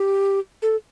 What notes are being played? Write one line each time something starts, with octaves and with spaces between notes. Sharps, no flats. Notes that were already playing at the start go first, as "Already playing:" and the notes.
Already playing: G4
A4